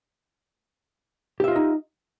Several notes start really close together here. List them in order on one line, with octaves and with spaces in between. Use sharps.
G4 E5 F4 D#5 D#4